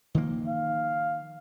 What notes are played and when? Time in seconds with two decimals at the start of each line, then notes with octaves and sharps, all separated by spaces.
0.15 D#3 F3 A#3
0.47 F5